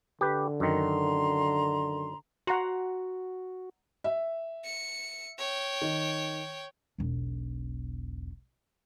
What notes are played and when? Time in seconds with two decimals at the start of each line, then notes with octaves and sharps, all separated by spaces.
0.21 D3 G4 B4
0.60 F#2 D#3 A#5 C6
2.47 F#4 F#5 A#5 C6
4.04 E5
4.64 C#7
5.38 C#5 G5
5.82 D#3
6.98 E1 B1